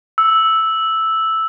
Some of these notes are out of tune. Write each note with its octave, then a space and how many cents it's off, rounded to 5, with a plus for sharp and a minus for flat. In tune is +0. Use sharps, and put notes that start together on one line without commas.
E6 -5